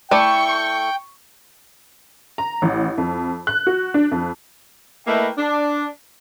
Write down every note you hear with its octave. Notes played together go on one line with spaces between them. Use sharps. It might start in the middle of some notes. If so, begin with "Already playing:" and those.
A3 E4 D5 G5 C#6
A#5
A1
F2
F#6
F#4
D4
F2
A3 A#3 E4 B4 D#5 G5
D4